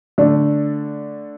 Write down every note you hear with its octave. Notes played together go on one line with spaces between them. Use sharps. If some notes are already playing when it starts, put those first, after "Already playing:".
D3 A3 D4